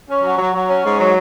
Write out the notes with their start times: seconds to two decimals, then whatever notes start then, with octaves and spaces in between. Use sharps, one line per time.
0.09 C#4
0.23 F#3
0.38 F#3
0.54 F#3
0.68 C#4
0.84 G#2
0.98 F#3